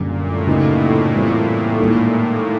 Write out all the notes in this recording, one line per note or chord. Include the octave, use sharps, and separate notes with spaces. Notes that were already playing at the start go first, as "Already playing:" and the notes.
Already playing: F#2 A#2 D3 G3
A2
C#3 F#3 B3 D#4
E3 G3 C4 F4
G#2 D#3 G3 A#3